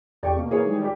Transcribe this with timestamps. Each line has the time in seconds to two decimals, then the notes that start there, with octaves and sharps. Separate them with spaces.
0.23 E2 G4 A4 D5 G5 C#6
0.36 B2 A#3
0.50 E3 G#4 C#5
0.64 D#3 G3 G#3
0.81 G4 D5